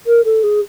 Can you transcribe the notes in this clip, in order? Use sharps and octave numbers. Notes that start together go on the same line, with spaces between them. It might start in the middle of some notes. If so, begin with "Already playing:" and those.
A#4
A4
G#4